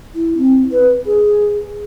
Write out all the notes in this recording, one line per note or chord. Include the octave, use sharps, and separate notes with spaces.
E4
C4
B4
G#4